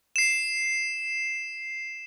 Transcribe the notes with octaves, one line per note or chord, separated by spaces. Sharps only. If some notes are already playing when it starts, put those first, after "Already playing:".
C7 E7